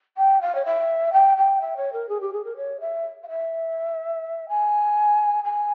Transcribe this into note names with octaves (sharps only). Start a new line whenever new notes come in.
G5
F5
C#5
E5
G5
G5
E5
C#5
A#4
G#4
G4
G#4
A#4
C#5
E5
F5
E5
G#5
G#5